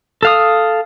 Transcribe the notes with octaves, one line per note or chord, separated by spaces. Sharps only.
A4 F5 D#6